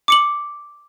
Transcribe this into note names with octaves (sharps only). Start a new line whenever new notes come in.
D6 C#7 F#7